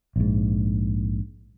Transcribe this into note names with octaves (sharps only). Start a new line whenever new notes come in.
A#1 G#2